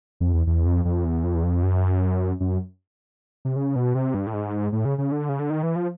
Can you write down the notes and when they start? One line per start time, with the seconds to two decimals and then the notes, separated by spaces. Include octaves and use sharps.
0.20 F2
0.34 E2
0.47 E2
0.66 F2
0.85 F2
1.05 E2
1.24 F2
1.35 E2
1.43 F2
1.63 F#2
2.40 F#2
3.45 C3
3.56 C#3
3.76 B2
3.95 C3
4.14 G2
4.27 A2
4.34 G#2
4.72 A2
4.85 C#3
4.98 C#3
5.12 D3
5.29 C#3
5.39 D3
5.50 D#3
5.63 E3
5.76 F3